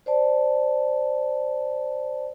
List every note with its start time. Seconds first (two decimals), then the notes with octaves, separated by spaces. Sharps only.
0.06 C5 D5 A5